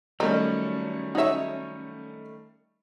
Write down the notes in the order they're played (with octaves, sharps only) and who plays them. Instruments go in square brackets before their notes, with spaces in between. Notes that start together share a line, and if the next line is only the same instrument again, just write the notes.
[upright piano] D#3 G3 A3 [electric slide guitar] F#3 C#4 [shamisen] D#4
[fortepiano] D#4 C#5 [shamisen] F#4 E5